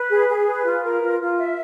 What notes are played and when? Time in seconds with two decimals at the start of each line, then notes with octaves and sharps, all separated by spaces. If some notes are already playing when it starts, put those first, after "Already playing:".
Already playing: B4
0.10 G#4
0.29 G#4
0.47 B4
0.65 F4
0.84 A#4
1.02 F4
1.21 F4
1.38 E5